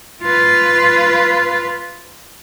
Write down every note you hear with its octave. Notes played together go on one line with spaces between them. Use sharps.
F4 B4